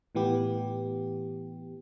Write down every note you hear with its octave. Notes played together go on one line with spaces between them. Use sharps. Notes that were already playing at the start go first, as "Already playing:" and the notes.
A2 E3 B3 G4